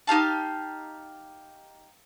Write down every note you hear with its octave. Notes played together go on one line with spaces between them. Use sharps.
D#4 G4 F5 A5